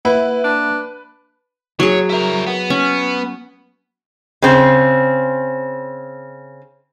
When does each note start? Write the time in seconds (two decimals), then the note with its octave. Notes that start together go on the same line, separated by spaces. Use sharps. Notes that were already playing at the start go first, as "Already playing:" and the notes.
0.05 A#3 E4 B4 E5 F#5
0.44 D4
1.80 F#3 G#4 C#5
2.10 E4 A#4
2.47 B3
2.70 C#4
4.42 C#3 C4